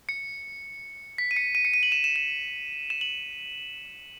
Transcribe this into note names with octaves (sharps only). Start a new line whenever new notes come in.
C#7
B6
D#7
C#7
D#7
C#7
D#7
F#7
E7
E7
E7
E7
F#7